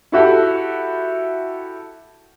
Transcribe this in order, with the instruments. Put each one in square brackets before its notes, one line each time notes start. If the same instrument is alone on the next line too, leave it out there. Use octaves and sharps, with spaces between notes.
[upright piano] E4 F#4 G4 A4